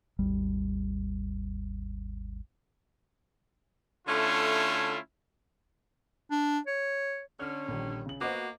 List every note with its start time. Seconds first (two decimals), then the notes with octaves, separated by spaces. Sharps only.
0.19 G#1 D#2 G3
4.08 D3 A3 C#4 E4 F4
6.31 D4
6.67 C#5
7.39 D3 C#4 F6
7.69 A#1 D#3 G3
8.06 C#3 F#7
8.21 A#3 B3 F#4 C5 D#5 D6